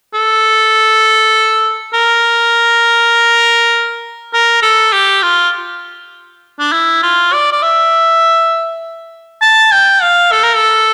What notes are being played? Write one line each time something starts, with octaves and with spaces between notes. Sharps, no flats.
A4
A#4
A#4
A4
G4
F4
D4
E4
F4
D5
D5
E5
A5
G5
F5
A4
A#4
A4